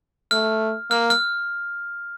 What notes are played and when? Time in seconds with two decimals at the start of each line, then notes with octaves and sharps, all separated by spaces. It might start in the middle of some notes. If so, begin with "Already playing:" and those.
0.31 A3 F6
0.91 A#3 F6
1.10 F6